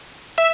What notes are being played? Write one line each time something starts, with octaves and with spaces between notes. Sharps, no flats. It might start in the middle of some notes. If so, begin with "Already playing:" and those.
E5 E6